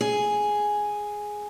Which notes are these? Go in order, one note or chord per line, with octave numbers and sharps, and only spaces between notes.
G#4